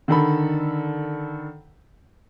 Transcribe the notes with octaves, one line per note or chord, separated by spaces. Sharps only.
D3 D#3 A4 B5